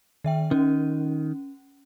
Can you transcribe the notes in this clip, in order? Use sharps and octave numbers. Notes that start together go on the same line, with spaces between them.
D#3 E5 G5
D#3 C#4